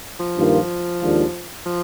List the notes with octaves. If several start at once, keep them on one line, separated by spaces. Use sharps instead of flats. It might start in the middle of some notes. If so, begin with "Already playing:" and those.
F3
G2 D#3 A#3 F4
D#2 D#3 G#3 D4 F4
F3